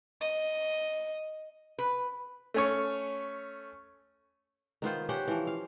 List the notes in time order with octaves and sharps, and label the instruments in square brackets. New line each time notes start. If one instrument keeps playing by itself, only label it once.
[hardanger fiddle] D#5
[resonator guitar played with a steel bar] B4
[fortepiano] A3 C#4 C#5
[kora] D#3 B3 F4 C5
C#4 G4 C5 F#5
E3 F3
F5